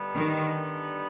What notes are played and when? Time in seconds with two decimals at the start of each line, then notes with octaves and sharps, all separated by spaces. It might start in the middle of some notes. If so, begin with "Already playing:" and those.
Already playing: G2 D3 G3 B3 D#4
0.15 D#3